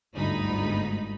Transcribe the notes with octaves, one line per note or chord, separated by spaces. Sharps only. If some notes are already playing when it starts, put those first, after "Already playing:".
G1 D2 G#2 D#4 B5